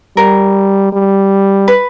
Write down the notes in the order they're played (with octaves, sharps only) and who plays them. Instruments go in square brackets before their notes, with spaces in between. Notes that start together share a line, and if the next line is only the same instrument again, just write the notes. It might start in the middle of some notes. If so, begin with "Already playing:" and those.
[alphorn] G3 [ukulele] A#4
[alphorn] G3
[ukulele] B4